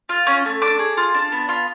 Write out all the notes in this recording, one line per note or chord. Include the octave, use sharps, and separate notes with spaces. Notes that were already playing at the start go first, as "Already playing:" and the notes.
F4
C#4
A3
D4 D6
G#4
F4
D4
B3
F4